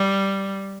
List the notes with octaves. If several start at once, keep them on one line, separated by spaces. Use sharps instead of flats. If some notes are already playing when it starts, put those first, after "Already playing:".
Already playing: G3